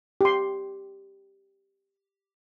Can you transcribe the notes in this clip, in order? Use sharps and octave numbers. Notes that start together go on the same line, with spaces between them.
G4 C6